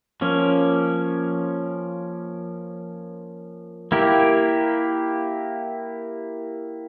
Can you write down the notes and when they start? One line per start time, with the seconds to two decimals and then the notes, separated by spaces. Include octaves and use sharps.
0.21 F3 A#3 C#4
3.92 A#3 E4 G4